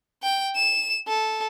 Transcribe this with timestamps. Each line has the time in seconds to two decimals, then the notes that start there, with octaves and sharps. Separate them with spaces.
0.23 G5
0.56 E7
1.07 A4